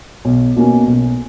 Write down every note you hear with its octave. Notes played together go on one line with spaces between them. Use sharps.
B1
B2 A#3 C#4
B1